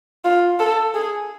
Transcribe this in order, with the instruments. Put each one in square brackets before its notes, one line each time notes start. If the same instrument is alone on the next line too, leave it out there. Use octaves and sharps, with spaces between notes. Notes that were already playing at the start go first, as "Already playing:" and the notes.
[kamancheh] F4
A4
G#4